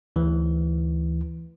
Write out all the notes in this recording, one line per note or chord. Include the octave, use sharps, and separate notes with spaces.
D2 E3